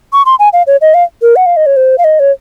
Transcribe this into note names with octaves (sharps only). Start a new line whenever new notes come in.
C#6
C6
G#5
F5
C#5
D#5
F5
A#4
F#5
F5
D#5
C#5
C5
F5
D#5
C#5